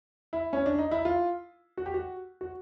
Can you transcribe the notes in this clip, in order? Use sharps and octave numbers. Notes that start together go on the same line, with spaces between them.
E4
C#4
D4
D#4
E4
F4
F#4
G4
F#4
F#4